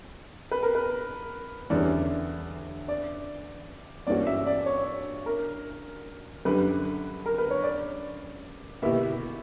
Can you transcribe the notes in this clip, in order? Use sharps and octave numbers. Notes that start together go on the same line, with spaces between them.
B4
A#4
B4
E2 D3 G3 C#4 D5
D5
G2 E3 A#3 C#4 F#4 D5
E5
D5
C#5
A#4
F#2 D3 G3 B4
A#4
B4
C#5
D5
B2 A#3 E4 G4 E5